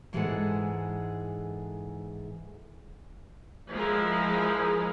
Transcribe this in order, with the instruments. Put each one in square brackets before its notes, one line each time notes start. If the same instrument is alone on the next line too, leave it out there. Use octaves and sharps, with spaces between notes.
[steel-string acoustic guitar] G#2 E3 G#3 G#4 A4 F#5
[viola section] F3 G#3 E4 A#4